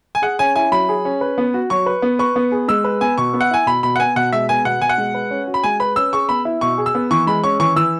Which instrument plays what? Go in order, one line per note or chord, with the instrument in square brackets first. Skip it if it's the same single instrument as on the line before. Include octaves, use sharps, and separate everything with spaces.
[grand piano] G#5
[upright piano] G#4 [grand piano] F#5
[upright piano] C#4 [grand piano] G#5
[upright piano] E4 [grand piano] G#5
[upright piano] F#3 [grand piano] B5
[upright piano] G#4
C#4
B4
B3
F#4
[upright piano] F#3 [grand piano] C#6
[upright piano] B4
B3
[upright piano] B4 [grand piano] C#6
[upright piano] B3
G#4
[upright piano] G#3 [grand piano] E6
[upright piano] B4
[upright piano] B3 [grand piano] G#5
[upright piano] B2 [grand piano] C#6
[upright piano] B3
[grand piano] F#5
[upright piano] E4 [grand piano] G#5
[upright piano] B2 [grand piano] B5
[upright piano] B2 [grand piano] B5
[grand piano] F#5
[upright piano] B3 [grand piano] G#5
[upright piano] B2 [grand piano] F#5
[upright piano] G#3 [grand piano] E5
[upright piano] B3 [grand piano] G#5
[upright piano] B2 [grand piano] F#5
[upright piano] B2 [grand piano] G#5
[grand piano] F#5
[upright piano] G#3
B4
C#4
F#4
[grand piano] B5
[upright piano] G#3 [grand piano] G#5
[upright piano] B4 [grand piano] B5
[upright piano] C#4 [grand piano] E6
[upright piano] G#4 [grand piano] C#6
[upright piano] B3 [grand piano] B5
[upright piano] E4
[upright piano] B2 [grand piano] C#6
[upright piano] G#4
[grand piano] E6
[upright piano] B3
[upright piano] E3 [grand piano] C#6
[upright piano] G#3 [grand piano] B5
[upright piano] C#4 [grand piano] C#6
[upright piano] E3 [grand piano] C#6
[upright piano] E3 [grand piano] E6